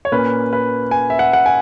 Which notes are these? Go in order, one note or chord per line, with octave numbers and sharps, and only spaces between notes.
C#5
A#2 A#3 C#4 B4
B4
G#5
E5
F#5
F#5
G#5